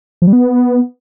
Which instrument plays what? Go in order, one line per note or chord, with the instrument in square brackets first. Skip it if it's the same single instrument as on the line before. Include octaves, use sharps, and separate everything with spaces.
[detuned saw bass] F3
G3
B3